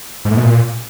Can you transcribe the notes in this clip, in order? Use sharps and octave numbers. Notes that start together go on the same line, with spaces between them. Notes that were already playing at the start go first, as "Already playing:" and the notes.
G#2
A2
B2
A#2